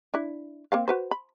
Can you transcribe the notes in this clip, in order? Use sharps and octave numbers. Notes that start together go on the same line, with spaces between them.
D4 E4
A#3 C4 F5
F#4 B4 C5
B5